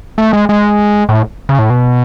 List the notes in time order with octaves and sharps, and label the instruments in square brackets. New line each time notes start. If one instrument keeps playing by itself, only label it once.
[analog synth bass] A3
G#3
G#3
A2
C#3
A2
B2